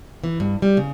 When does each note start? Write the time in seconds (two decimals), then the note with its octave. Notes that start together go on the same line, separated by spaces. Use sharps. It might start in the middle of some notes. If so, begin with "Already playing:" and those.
0.24 E3
0.40 G2
0.62 G3
0.77 C#3